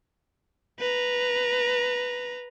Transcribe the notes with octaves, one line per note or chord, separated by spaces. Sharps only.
B4 A#5